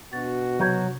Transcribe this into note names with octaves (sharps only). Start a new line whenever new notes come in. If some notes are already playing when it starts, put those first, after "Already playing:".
B2 D4 F#4 A6
C3 F#3 G6 G#6